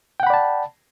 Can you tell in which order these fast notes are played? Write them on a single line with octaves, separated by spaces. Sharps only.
G5 F#5 B5 D5 A5